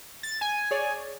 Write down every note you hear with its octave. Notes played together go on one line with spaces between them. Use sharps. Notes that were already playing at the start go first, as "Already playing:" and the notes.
A6
G#5
G#4 C#5 D5